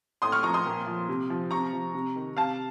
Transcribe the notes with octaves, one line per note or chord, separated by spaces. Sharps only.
A2 C6 D#6
C#6 F6
F3 A#5 C#6
C6 D#6
A#2
F3
C3
F3
C3 A#5 C#6
F3
C3
D#3
C3 F5 A5